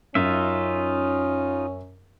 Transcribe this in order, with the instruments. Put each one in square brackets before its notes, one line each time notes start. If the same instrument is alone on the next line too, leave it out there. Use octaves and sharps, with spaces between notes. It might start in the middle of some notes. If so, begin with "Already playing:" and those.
[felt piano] F#2 [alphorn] C#4 [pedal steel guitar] D#4 F4 E5